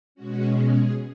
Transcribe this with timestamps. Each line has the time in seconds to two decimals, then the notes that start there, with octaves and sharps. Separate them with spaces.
0.15 B2 G#3 C#4 F#4
0.60 G#4